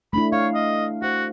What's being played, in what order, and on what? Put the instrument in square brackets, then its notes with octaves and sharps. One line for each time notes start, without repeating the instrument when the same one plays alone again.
[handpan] A3 D4 E4 [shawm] B5
[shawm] C#5 [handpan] F5
[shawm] D#5
[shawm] F#4 [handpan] C5 F#5